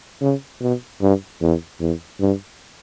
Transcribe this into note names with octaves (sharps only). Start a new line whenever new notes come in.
C#3
B2
G2
E2
E2
G2